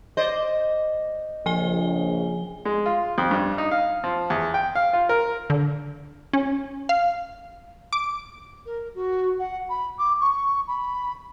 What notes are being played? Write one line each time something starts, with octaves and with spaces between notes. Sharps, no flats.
C5 D5 D#5
A#1 C#3 F3 G#5 G7
G#3
F4
F2
G2
D#4
F5
F3
E2
G5
F5
F4
A#4
D3
C#4
F5
D6
A#4
F#4
F#5
B5
D6
C#6
B5